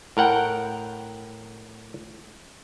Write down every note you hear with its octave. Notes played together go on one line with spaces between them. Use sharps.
A2 A#4 F#5 G5